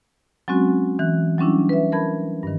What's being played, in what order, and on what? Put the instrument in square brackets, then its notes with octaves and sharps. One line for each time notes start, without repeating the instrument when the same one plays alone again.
[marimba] F#3 G#3 C4 C#4 F#4
E3 F#6
F#3 G3 C#4 D4 E4
B4 E5
A#4 A5 B5 G#6
G2 D#3